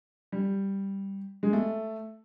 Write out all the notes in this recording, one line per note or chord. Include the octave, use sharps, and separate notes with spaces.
G3
G#3
A3